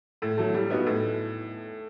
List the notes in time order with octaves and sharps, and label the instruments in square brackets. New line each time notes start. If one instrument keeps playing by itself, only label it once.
[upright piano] A2
F#3 A3
G3
B3 D#4 F#4
A2